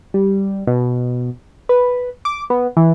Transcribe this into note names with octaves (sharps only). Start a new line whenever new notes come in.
G3
B2
B4
D6
B3
E3